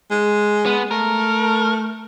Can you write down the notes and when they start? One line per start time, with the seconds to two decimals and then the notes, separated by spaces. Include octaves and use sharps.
0.10 G#3
0.65 B3
0.91 A3 A#4